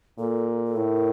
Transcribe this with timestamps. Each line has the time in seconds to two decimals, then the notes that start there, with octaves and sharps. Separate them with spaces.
0.18 A#2 A4
0.66 A4
0.76 A2 A#4